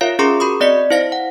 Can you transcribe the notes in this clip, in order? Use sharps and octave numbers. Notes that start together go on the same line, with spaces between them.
F4 A#4 C#5 E5 F5
C#4 G#4 A#4 A#5 C6 D6
F#4 B5 C#6 D#6
C4 D5 D#5 B6 C#7
E4 C5 F5 A#6
F#5